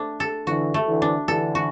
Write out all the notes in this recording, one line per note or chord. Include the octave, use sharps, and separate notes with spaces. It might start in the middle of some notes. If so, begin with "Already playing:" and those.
Already playing: A3 D4
A4
D3 E3 F#4
A3
D3 E3
D4
D3 E3 A4
F#4